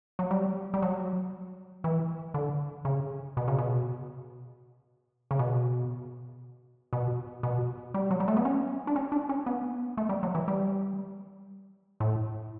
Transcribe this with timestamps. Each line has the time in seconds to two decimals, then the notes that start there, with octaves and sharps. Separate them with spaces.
0.19 F#3
0.31 G3
0.74 G3
0.82 F#3
1.84 E3
2.34 D3
2.85 C#3
3.37 B2
3.48 C#3
3.58 B2
5.31 C#3
5.39 B2
6.93 B2
7.43 B2
7.94 G3
8.11 F#3
8.20 G3
8.28 A3
8.37 B3
8.45 C#4
8.87 D4
8.96 C#4
9.12 D4
9.29 C#4
9.46 B3
9.97 A3
10.09 G3
10.23 F#3
10.35 E3
10.48 G3
12.00 A2